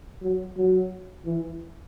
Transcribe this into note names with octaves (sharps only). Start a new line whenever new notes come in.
F#3
F#3
E3